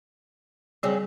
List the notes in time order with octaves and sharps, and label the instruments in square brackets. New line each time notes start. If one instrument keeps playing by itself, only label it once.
[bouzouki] C#3 F#3 C4 [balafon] G3 G#4